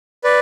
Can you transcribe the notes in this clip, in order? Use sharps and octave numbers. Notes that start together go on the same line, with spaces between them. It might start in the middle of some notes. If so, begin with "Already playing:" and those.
B4 D5